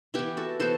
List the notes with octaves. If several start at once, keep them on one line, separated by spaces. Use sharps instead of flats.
E3 B3 E4 G4
F#4 A4
E3 B3 A4 C5